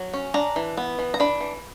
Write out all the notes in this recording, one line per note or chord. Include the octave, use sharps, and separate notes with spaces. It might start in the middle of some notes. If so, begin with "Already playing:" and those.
Already playing: F#3
C#4
D4 A#5
E3
B3
E3
A#5
D4 B5
E3